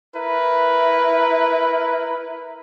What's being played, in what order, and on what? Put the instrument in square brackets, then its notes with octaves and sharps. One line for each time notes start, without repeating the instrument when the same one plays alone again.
[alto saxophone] E4 [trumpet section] A#4 B4